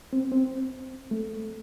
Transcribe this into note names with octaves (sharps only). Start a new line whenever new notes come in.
C4
C4
A3